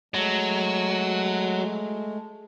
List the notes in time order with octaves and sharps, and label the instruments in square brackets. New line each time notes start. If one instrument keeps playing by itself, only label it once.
[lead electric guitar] F#3 [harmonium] G#3 A3